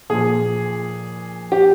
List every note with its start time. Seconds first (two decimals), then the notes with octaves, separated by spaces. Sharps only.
0.10 A#2 F3 G#4
1.52 G4